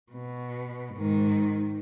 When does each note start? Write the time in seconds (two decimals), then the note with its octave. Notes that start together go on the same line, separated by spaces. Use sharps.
0.12 B2
0.95 G#2 D#3